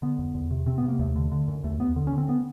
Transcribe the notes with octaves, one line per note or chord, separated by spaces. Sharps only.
D3 B3
F2
E2
C3
C3 C4
B3
C3
A#3
D#2 A3
D3
D3
F#2
D#2 A3
D#2 B3
D3
C#4
D3 C4
B3